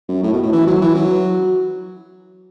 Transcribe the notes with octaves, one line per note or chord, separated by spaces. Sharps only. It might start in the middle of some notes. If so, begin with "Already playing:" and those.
F#2
A2
B2
A2
E3
F#3
E3
F#3